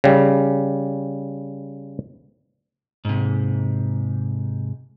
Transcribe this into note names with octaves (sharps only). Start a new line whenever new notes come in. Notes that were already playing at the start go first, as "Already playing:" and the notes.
C#3 G3
G#2 C3